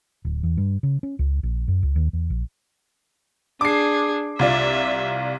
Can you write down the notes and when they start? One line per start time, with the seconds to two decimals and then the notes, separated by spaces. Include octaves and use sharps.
0.25 D1
0.43 E2
0.57 G2
0.83 C#3
1.03 C#4
1.19 C#2
1.43 A#1
1.68 F#2
1.83 C#2
1.96 D#2
2.13 E2
2.30 A#1
3.61 D4 G#4 D6 C7
4.39 C2 F4 D5 E5